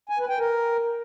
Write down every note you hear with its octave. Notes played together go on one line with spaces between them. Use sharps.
G#5
B4
G5
A#4